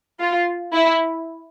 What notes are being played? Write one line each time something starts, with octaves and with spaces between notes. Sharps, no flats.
F4
E4